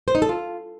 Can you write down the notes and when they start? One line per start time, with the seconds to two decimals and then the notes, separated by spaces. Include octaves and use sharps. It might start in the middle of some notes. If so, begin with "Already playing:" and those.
0.08 C5
0.15 D#4
0.22 A4
0.29 F4